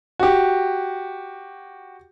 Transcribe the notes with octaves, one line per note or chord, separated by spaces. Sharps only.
F#4 G4